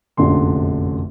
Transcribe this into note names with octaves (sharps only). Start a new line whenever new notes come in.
F1 A#1 F#2 D3 C6